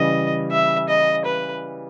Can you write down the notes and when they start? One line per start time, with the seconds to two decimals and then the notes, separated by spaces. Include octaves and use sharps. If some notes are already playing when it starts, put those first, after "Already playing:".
Already playing: C#3 E3 G3 D#5
0.51 E5
0.89 D#5
1.25 B4